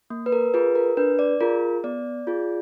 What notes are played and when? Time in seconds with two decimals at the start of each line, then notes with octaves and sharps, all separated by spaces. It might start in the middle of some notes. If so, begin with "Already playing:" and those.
0.10 A#3
0.26 B4
0.32 A#4
0.54 F4 G#4 B4
0.75 A#4
0.97 D4 B4
1.19 D5
1.41 F4 G#4 A#4
1.84 B3 D5
2.27 F4 G#4